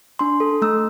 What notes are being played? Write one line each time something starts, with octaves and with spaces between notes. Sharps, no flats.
D4 C6
A4
A3 E6